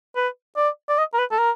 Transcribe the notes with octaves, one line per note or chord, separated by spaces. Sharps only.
B4
D5
D5
D#5
A#4
B4
A4
A#4